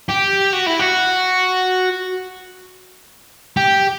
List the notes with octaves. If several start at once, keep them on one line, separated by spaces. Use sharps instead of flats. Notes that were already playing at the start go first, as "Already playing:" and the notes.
G4
F#4
E4
F#4
G4